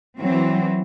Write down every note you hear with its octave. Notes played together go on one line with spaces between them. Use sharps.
E3 F#3 C4